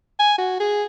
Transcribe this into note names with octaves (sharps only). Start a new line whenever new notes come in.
G#5
F#4
G#4